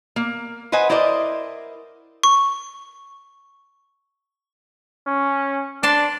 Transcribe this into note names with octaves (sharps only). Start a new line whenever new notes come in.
A#3
B4 C5 D#5 F#5 G#5
E4 A#4 C5 D5 D#5
C#6
C#4
D4 D5 A5 C6